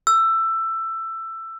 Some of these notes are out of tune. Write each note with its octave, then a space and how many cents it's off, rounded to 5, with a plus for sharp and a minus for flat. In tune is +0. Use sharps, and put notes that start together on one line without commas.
E6 +15